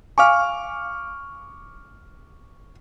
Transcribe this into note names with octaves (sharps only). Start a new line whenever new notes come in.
F5 G#5 C#6 D6 F6